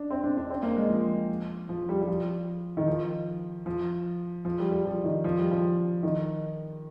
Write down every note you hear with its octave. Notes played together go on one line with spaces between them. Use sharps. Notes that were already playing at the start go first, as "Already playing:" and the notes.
Already playing: D4
C4
D4
D4
C4
A#3
G#3
F3
F3
G3
G3
F3
D#3
F3
F3
F3
G3
G3
F3
D#3
F3
G3
F3
D#3